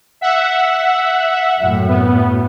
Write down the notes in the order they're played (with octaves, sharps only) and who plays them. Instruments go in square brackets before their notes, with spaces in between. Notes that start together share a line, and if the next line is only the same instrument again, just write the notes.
[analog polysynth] E5 F#5
[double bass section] F#2 A2
[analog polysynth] B3